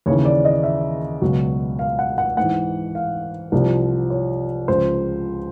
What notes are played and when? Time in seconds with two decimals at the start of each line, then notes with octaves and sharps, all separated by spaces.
0.06 D#2 C#3 E3 C#5
0.25 D5
0.45 D#5
0.64 E5
1.21 C#2 B2 F#3
1.79 F5
1.99 F#5
2.18 F#5
2.37 G#2 E3 F#5
2.95 F5
3.52 C2 C3 F3
4.10 C#5
4.68 C#2 C#3 F3 C5